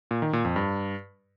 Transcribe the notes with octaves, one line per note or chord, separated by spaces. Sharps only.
A#2
D#3
A#2
F2
G2